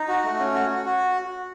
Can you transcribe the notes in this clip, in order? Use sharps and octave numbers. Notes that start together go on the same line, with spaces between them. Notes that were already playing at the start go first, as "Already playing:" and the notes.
Already playing: D#4
F#4
A3
C#4
F#4
F#4
F#4